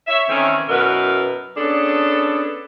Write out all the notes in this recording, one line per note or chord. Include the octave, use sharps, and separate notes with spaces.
C#5 E5
D#3 E3 A3 C4 C#4
F#2 B2 E4 A#4 B4
B3 C#4 D4 G#4 A4